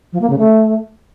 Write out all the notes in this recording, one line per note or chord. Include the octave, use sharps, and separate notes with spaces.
F3
A#3
C#3
A3